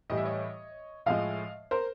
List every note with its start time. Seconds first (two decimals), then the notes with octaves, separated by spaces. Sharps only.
0.10 A2 E3 G3 D#5
0.17 E5
0.25 C#5 D#5
1.06 A2 F3 G#3 D#5 F5
1.71 A#4 C5